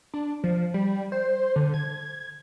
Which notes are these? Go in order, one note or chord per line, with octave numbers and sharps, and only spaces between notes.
D4
F3
G3
C5
D3
G#6